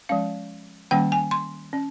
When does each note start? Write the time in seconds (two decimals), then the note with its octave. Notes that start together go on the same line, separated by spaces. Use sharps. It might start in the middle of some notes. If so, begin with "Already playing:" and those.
0.09 F3 G#3 C#4 F5
0.91 D#3 G3 A#3 C#4 G5
1.12 G#5
1.31 C6
1.73 C#4